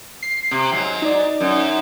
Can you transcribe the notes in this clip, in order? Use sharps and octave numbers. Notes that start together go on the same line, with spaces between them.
C7
C3
G#2 F#3
D#4 D5
F#2